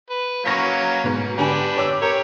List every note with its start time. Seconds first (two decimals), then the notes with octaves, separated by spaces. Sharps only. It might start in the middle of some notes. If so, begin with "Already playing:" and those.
0.10 B4
0.45 F#3 A#3 C#4 C#6 A#6 B6
1.04 G#2 B2
1.38 D3 D4 G4 B4 G#5
1.77 C#5 D6 E6
2.02 G4 A#4 C#5